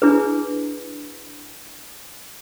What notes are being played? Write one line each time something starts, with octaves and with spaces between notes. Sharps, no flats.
D4 E4 G#4 B4